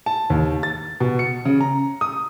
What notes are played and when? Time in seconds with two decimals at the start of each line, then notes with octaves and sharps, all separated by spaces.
0.06 A5
0.30 D#2
0.63 A6
1.00 B2
1.19 C#7
1.45 C#3
1.61 A#5
2.01 D#6